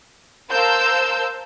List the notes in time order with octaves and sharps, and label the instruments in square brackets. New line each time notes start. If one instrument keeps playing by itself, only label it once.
[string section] A#4 C5 F5 A5 E6 G6